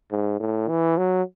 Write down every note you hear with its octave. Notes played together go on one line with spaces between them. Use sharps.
G#2
A2
E3
F#3